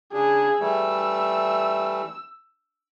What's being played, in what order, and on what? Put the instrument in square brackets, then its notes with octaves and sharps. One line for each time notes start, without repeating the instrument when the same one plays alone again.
[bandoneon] C#3 D4 [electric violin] G#4
[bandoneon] E3 G3 A3 [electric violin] E6